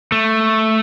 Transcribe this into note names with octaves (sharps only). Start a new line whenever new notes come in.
A3